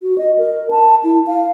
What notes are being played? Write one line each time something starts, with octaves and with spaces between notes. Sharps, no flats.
F#4
D#5
A#4
A5
E4
F5